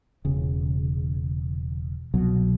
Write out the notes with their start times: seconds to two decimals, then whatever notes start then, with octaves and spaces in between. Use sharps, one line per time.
0.25 E1 C#3
2.14 C2 B2 F#3